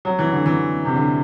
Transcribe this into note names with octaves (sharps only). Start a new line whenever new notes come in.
F#3
E3
D3
E3
C3
D3